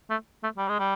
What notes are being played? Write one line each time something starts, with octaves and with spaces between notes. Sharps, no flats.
A3
A3
G3
G#3
G3